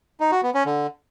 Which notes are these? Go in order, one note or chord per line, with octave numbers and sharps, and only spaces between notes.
D#4
F#4
B3
C#4
D3